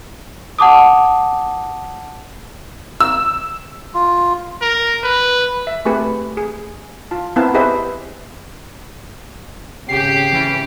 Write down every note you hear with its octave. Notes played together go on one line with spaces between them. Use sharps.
F#5 A5 D6 D#6
E6
F4
A#4
B4
E5
A3 C4 G4 G#4 B4
G#4
F4 A5
B3 C4 E4 A#4 F5 A5
G4 G#4 B4 C5 D#5 E5
G#1 C#3 G4 C7
E3 C#4